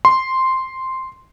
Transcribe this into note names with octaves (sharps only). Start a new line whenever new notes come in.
C6